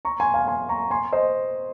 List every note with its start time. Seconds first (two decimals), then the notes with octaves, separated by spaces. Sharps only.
0.05 A#5 C#6
0.20 G#5 C6
0.34 F5 G#5
0.47 G#5 C6
0.69 A#5 C#6
0.91 G#5 C6
1.13 C5 D#5